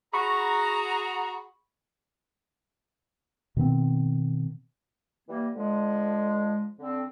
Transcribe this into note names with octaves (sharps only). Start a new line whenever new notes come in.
F#4 G#4 A#5 B5 C#6
B2 D#3 B3 C4
E3 G3 A#3
D3 F3 G#3
D3 C4